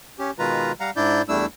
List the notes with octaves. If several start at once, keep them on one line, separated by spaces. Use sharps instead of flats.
C#4 G4
B2 D#3 G#3 F4 B4 A#5
G3 F5 F#5 A#5
G#2 D4 E4 D5 G6
E2 G3 A3 D4 E4 E6